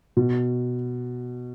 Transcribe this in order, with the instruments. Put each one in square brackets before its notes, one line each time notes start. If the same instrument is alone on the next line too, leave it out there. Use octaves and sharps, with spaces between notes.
[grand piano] B2